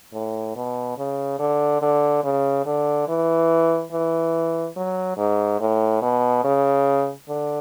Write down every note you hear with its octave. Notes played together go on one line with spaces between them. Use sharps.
A2
B2
C#3
D3
D3
C#3
D3
E3
E3
F#3
G#2
A2
B2
C#3
D3